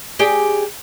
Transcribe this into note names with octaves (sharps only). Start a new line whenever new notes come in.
G4 G#4 D5